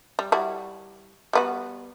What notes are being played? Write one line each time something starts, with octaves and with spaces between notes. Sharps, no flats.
G3
G3 E4 F#4
G3 B3 F#4